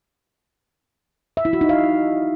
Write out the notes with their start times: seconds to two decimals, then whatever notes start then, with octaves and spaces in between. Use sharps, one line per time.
1.37 E5
1.45 E4
1.53 F#4
1.61 D#4
1.69 F5